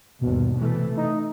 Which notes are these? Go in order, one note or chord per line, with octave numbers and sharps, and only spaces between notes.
G1 D#2 B2
C3 E3 A3
D#4